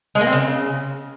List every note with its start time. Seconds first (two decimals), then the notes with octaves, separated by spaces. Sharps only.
0.15 G#3
0.21 A#3
0.27 C4
0.32 C#3